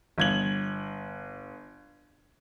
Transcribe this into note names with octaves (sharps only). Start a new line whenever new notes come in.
G1 G#6 F#7